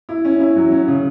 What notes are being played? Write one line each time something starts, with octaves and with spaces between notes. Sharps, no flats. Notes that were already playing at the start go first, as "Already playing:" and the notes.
E4
C#4
E4
F#3
C#4
C#3